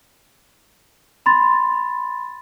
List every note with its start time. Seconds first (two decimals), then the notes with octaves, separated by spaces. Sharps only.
1.26 B5 C6 A6